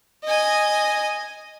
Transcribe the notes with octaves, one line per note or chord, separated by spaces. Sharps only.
D#5 G#5